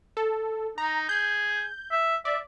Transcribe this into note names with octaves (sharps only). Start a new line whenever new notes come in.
A4
D#4 A#5
G#4 G6
E5
D5 E5